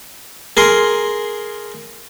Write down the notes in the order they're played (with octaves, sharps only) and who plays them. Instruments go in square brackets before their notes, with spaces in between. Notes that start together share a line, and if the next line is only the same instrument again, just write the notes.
[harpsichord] G#4 A#4 C6